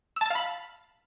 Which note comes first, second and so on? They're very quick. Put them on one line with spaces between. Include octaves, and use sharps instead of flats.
E6 A5 A6 F5 B5